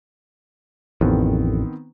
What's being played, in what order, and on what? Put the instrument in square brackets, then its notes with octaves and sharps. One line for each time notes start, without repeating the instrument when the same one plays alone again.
[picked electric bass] A1 F2 [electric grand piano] D#3 B3 C4